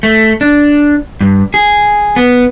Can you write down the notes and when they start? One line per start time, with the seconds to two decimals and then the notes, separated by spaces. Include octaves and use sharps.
0.03 A3
0.41 D4
1.21 G2
1.54 G#4
2.16 B3